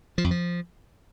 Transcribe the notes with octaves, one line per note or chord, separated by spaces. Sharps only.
F3
F2
F3